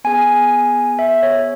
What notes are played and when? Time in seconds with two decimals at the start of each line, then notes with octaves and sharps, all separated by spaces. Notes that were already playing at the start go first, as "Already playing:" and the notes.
0.04 B3 G#4 G#5
0.99 E5
1.23 C#5